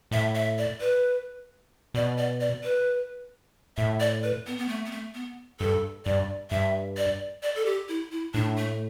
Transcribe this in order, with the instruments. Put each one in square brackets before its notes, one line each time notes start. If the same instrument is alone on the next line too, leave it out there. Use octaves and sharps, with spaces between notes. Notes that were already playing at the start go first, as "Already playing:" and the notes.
[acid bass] A2 [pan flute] E5
[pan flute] E5
D5
B4
[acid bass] B2 [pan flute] D5
[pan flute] D5
D5
B4
[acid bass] A2 [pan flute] E5
[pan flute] D5
B4
B3
B3
A3
B3
A3
B3
[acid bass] G2 [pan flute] A4
[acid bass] G2 [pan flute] D5
[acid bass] G2 [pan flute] E5
[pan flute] D5
D5
A4
G4
E4
E4
[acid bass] A2 [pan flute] D4
[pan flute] A3